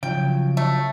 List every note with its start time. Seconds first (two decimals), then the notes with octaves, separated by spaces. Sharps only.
0.03 C#3 F3 F#3 G5
0.57 A3